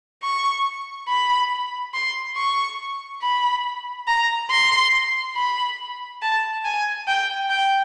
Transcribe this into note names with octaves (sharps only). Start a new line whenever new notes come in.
C#6
B5
C6
C#6
B5
A#5
C6
B5
A5
G#5
G5
G5